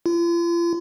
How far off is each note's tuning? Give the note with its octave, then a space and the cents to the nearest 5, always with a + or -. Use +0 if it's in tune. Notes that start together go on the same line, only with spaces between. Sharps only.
F4 -40